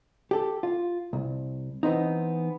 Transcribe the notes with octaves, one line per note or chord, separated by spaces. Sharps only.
G4 A4
F4
C2
E3 B3 C4 D#4